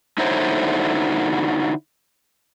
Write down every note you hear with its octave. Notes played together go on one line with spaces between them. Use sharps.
D3 D#4 E4 F#4 C5 C#5